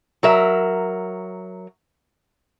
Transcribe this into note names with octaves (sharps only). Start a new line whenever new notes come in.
F#3 A#4 E5